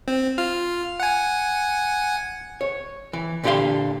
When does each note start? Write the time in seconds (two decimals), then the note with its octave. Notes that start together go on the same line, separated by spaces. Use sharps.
0.08 C4
0.38 F4 F6
1.00 F#5 G#5
2.61 C#5
3.13 E3
3.44 A#2 D3 G4 C#5 F5 C6